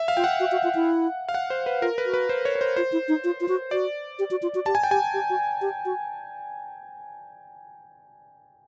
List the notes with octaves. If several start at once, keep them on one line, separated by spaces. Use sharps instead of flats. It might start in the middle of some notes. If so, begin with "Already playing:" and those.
Already playing: E5
F5
F4 G5
F#5
F#4
F#4
F4
E4
F5
F#5
C5
B4
F4 A#4
B4
F#4
B4
C5
C#5
C#5
C5
F4 C5
E4
D#4
F4
F4
F#4
F#4 D5
G4
F#4
F4
F#4
G4 A5
G#5
G5
G4 G#5
G4
F#4
G4
F#4